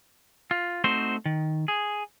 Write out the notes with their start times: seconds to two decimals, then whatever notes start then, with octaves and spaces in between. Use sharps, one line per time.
0.51 F4
0.84 A3 C4 D#4 F#4 C5
1.26 D#3
1.68 G#4